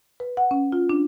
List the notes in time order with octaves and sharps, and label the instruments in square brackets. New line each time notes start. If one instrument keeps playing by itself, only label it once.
[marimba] B4
F#5
C#4
F4
D4